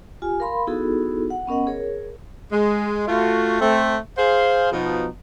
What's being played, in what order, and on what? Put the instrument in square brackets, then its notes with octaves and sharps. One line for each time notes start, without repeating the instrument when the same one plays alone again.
[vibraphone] F4 G4 G#5
A#4 F5 B5 C6
B3 D#4 E4 F#4 G#4 A4
F#5
B3 C#4 A#4 D#5 F#5
G#4 A#4 C#5
[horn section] G#3
A3 F4 F#4
A3 C4
G#4 C5 F5
B2 F3 D#4